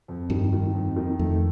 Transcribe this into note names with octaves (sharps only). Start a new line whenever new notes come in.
F2
G2 D#3
D#3
F2
D#3
F2 A3